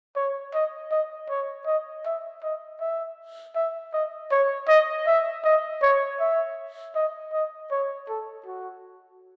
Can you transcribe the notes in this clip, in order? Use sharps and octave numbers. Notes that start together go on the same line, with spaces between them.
C#5
D#5
D#5
C#5
D#5
E5
D#5
E5
E5
D#5
C#5
D#5
E5
D#5
C#5
E5
D#5
D#5
C#5
A4
F#4